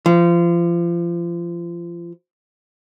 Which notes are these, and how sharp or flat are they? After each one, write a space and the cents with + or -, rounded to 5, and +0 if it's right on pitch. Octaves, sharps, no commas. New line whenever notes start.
F3 -30